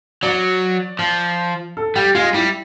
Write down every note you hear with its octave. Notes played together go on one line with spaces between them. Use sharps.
F#3 D5
F3
A4
G3 G4
G#3 F4
G3 E4